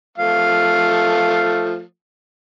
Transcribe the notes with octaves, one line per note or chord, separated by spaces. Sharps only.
F3 A3 F5